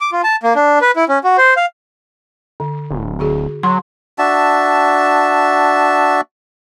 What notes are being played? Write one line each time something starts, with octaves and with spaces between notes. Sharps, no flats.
D6
F4
A5
A#3
D4
B4
E4
C#4
F#4
C5
F5
D3
D1
D3 F#4 G#4
F#3 C6
D4 F#4 E5 A5